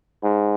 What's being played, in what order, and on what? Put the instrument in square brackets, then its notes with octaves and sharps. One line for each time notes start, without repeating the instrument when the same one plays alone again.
[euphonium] G#2